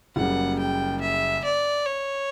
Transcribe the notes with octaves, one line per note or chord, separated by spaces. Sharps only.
F#1 F#2 C#3 G3 A#3 F#5
G5
E5
D5
C#5